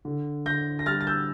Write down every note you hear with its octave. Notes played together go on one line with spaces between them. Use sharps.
D3
D3 G6 A#6
A#6
G3 F6 A6
A6
E6 G6